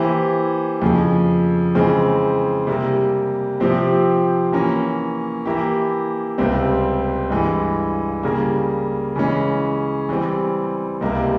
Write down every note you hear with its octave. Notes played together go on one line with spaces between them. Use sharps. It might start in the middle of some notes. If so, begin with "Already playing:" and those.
Already playing: E3 A#3 E4 G4 C5
F2 C#3 F3
C#3 E3 G#3 C4
C3 G3 A#3
C3 F3 C4 G4
E3 A#3 C#4
E3 A#3 E4 G4
C#2 C3 G3 C4
G2 E3 G#3
C#3 G3 A#3
C#3 E3 G#3 C#4
E3 G3 C4
C#2 C3 G3 A#3